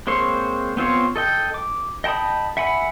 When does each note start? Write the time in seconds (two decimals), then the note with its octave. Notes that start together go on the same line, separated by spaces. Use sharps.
0.07 G#3 A#3 C4 C5 C#5
0.77 B3 C4 F4 C5 C#5
1.16 A4 D#5 G5
1.54 D6
2.04 D#5 G5 A5 B5 D#6
2.57 E5 F#5 G#5 B5